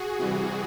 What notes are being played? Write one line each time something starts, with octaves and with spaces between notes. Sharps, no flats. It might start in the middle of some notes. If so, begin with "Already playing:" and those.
Already playing: F#4 G#4
C3 E3 G3